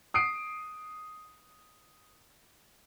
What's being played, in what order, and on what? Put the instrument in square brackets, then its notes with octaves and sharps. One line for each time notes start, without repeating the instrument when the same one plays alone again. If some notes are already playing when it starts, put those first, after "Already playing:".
[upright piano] D#6 C7 D7